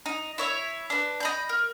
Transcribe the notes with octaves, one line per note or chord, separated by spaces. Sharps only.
D#4
E4 C#5 E5
D4 B4
D#5 B5 G6
A#4